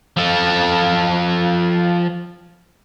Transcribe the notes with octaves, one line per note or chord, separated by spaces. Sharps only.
F3 A4